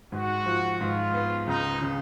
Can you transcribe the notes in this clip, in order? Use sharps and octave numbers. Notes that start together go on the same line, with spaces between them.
G#2 F#4
F3
G#2 F4
B3
C#2 D#4
C#3